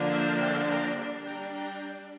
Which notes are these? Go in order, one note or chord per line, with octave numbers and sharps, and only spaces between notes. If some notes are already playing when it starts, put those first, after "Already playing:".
Already playing: D3 F3 A#3 D4
C5 E5
E5 G5
G5 A#5
G3 D4
G5 A#5
G5 A#5